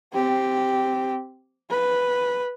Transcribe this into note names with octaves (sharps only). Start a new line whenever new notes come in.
C4 G4
B4